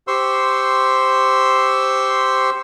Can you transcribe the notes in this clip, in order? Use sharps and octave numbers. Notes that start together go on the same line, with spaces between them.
G4 C5 C6 C#6 E6